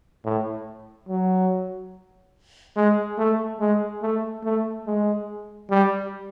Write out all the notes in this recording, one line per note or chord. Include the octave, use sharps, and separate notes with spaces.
A2
F#3
G#3
A3
G#3
A3
A3
G#3
G3